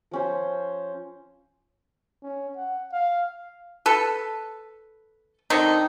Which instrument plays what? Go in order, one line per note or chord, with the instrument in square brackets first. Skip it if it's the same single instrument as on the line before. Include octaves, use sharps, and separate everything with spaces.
[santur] F3 C#4 C5
[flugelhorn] C#4
F#5
F5
[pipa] A4 B4
D3 D#3 C4 D#4